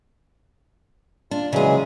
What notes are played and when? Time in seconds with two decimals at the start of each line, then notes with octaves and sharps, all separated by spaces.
1.31 D4 F4
1.53 C#3 E3 F#3 G#3 G#4